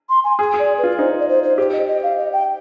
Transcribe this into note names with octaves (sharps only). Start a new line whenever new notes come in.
C6
G#5
G#4 G#5
G#4
D5
B4
F4
D#4 C5
D5
C5
C5
G4 C5
D#5
D#5
F5
D#5
G5